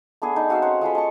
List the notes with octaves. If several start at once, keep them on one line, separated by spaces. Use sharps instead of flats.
A3 B3 D4 G#4
D#4
C4 F#4 F5 E6
C#4 C5 C#5 F#5
G#3 F4 A4 B5
D#5 A5 C#6